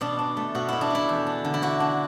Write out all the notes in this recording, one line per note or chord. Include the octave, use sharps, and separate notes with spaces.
B2 D4
D4
A3
B2 F#4
B2 E4
D4
A3 E4
E2
D4
D3
E4
D4 F#4
D4